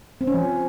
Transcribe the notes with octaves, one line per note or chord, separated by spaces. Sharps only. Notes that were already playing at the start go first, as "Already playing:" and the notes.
C4
C#4
F3